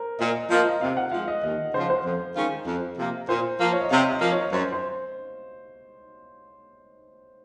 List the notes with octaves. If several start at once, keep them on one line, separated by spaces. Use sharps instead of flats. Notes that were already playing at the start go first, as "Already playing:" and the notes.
Already playing: A#4 C5
A#2 D#5
F3 A#3 D#5
C3 F5
F#5
F3 G#3 F5
D#5
D#2 D#5
C#3 F3 C5
C5
F2
D#3 G#3 C#4 F4
F2
C3 F3 A#3
A#2 C5
F3 A#3
C#5
D#5
C3 F5
D#5
F3 A#3
C#5
F#2 C5
C5